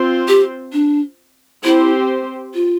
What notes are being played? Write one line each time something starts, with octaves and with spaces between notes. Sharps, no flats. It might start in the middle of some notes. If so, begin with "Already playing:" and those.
Already playing: C4 F4 C5
G4
D4
C4 E4 G4 C5
F4